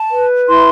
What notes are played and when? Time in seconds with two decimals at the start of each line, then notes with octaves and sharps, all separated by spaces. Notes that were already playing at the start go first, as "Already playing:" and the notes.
Already playing: A5
0.10 B4
0.48 E4 C6